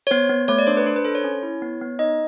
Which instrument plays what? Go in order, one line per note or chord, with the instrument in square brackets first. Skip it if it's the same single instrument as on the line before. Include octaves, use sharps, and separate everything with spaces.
[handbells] C#5
B3 C5
B3
A3 C#5
D5
D4 C5
B4
D4 C5
B4
A4 C5
C#5
C#4
E4
B3
B3
D#4 D#5